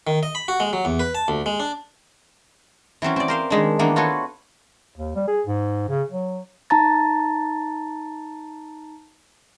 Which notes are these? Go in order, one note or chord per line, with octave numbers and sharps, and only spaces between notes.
D#3
D#5
B5
F#4
G#3
F#3
E2
B4
A5
D2
G#3
D4
E3 F#3 C4 C#4
C4 D5
A#4 C5 F5
D#3 G#3 D4
D#3 E3 A#3 B3 D4
F4 F#4 A4 B4 C#5
D#2
G3
G#4
G#2
C#3
F#3
D#4 A5 A#5 A6